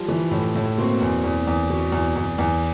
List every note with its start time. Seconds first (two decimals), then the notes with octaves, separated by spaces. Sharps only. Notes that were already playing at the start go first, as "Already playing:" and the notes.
Already playing: F3 G3
0.08 E3
0.31 A2
0.55 A2
0.77 B2 A#3 C4
1.01 E2
1.24 E2
1.47 E2
1.70 B2
1.92 E2
2.16 E2
2.38 E2